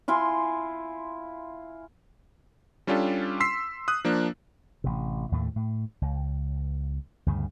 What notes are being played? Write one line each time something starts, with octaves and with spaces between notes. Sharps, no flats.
E4 F4 G#5 C6
G3 C#4 D4 F4 G4 A4
C6 E6 B6 C7
D#6 F#6
F3 A#3 D4
A1 C3
D#2 A2 A3
A2
C#2
D2 G2 C#3